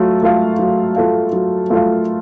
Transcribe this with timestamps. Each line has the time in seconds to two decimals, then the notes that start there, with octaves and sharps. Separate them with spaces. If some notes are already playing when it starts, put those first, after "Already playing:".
Already playing: F#3 A3 F4
0.23 A3 F4 A4 F5
0.59 F#3
0.96 A3 F4 A4 F5
1.32 F#3
1.70 A3 F4 A4 F5